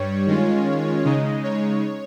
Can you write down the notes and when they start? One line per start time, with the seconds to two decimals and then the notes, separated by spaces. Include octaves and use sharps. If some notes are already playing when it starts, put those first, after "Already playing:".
Already playing: G2 G3 C#5
0.27 D#3 G#3 C#4 F4
1.04 C#3 G#3 D#4 D#5
1.44 C#5